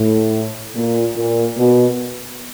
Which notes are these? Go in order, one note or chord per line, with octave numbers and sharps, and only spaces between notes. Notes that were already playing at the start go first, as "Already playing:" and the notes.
Already playing: A2
A#2
A#2
B2